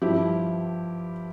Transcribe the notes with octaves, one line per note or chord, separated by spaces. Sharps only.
G2 F3 E4 G4